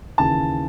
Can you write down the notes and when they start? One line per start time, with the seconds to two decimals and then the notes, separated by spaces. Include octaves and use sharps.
0.18 D#2 C#3 E3 A5